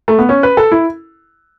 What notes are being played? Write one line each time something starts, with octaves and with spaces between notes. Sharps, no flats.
A3
B3
C#4
B4
A4
E4